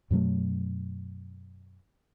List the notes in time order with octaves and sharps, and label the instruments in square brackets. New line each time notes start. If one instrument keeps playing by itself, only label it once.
[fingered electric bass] F#2 B2 F#3 A3